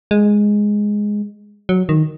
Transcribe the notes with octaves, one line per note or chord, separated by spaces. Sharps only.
G#3
F#3
D#3